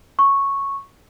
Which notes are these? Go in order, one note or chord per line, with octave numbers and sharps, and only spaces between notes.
C#6